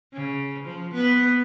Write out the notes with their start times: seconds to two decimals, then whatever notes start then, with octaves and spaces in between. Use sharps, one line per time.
0.13 C#3
0.65 F3
0.94 B3